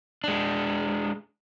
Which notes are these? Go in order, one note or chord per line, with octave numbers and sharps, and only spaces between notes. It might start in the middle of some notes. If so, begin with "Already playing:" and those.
G#3 D4